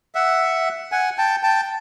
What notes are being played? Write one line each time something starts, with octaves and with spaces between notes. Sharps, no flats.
E5 F#5
F#5 G#5
G5 A5
G5 A5